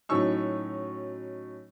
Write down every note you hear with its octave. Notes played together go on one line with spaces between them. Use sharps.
A2 F#3 C#4 D#4 C#6 E6